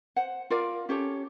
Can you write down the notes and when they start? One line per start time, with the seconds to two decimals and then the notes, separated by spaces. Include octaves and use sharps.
0.16 C5 F#5
0.50 F4 A#4 D5 F5
0.89 C#4 G4 A4 C#5